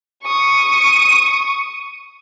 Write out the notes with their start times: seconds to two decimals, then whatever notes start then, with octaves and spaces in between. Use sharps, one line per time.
0.24 C#6 D#6